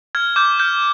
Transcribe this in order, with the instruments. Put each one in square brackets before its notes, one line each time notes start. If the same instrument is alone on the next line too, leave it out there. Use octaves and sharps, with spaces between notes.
[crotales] F6 G#6
D6 G6
F6 G6